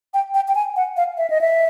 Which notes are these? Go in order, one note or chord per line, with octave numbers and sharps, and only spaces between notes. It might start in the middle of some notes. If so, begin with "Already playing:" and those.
G5
G5
G5
G#5
F#5
F5
E5
D#5
E5